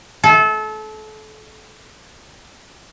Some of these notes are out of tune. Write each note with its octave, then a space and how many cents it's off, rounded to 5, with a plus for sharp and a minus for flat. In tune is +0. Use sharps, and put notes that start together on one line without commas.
A4 -30